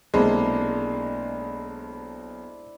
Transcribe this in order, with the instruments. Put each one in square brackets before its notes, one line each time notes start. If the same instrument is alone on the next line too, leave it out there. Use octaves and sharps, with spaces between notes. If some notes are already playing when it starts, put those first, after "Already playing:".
[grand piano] B1 C3 A#3 [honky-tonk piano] G#3 [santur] D4 E4 C5